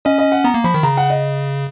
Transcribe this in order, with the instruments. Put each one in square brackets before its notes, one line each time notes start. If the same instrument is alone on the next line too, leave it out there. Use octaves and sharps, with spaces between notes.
[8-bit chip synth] C#4 [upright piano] D#5
[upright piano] D#5
F#5
[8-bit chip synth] B3 [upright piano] A#5
[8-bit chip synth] A#3
[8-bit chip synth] F3 [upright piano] B5
[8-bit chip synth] D#3
[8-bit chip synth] C#3 [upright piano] A#5
[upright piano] F#5
D#5